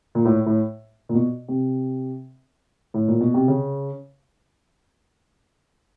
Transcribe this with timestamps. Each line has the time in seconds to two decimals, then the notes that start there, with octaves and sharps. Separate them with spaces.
0.15 A#2
0.25 A2
0.46 A2
1.09 A#2
1.14 B2
1.48 C3
2.94 A2
3.08 A#2
3.21 B2
3.34 C3
3.48 C#3